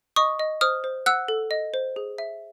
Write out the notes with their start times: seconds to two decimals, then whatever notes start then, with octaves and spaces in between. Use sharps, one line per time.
0.16 D#5 C#6 D#6
0.39 D#5
0.61 C5 D#6 F6
0.84 C5
1.06 F#5 E6 F#6
1.28 A4
1.51 D#5
1.74 C5
1.96 G#4
2.18 E5